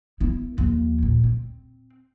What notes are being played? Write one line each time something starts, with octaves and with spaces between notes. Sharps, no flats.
B3 E4
D#2 F3
D2 A#2
C4